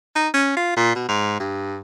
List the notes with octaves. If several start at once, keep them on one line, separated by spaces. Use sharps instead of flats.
D#4
C#4
F4
A#2
B2
G#2
G2